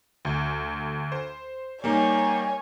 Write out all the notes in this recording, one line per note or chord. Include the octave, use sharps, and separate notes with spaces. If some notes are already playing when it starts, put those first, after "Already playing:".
D2
C5
G3 A#3 D#4 C#5 G#5